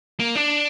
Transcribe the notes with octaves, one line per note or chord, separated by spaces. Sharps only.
A#3
D4